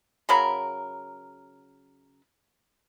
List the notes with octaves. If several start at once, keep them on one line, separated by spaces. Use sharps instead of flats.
C#3 F#3 A#4 B5